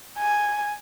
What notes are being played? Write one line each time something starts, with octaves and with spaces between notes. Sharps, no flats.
G#5